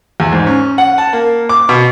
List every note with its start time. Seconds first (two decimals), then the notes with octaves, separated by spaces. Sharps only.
0.20 E2
0.33 G#2
0.46 C#4
0.78 F#5
0.98 A5
1.13 A#3
1.49 D6
1.69 B2